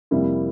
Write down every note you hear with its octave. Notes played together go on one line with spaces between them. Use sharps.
F2 C3 G3 A#3 E4